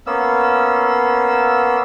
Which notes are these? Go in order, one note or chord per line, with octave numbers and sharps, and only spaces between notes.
A#3 B3 C#4 E6